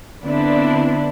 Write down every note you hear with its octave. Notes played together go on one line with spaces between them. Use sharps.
D3 B3 C4 D4 E4